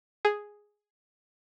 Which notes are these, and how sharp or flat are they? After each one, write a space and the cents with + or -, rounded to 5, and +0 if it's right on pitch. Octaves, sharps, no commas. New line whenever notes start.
G#4 +0